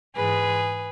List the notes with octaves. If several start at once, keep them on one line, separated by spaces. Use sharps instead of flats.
G#2 E3 G#3 G#4 B4